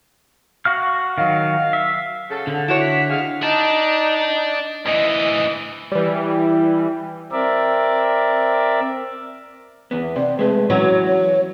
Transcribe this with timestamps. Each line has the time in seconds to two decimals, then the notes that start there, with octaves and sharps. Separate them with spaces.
0.65 F#4 F5 F6
1.18 D#3 F#3 F5
1.73 E5
2.30 C#3 F#4 A4
2.47 D3
2.68 D4 E4 F#4 C#5 E7
2.81 B6
3.09 C4 D#4 G#4 F5
3.43 D#4 D5 A5
4.86 D2 E3 D#5
5.92 E3 G3
7.32 C4 A#4 D5 E5
9.91 E2 B3
10.16 C3 D5
10.39 G#3 A3 B4
10.70 E3 F#3 C#4 C#5
11.07 C#5